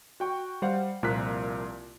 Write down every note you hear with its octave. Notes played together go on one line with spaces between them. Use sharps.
F#4 G5 C#6
G3 C5 F5 F#5
C2 A#2 F3 A#4 F#6 B6